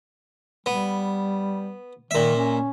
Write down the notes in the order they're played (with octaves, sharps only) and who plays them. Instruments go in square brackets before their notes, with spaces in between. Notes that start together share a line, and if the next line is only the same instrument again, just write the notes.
[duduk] G3 [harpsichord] B3
[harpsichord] A#2 E5 [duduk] D#3
[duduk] C#4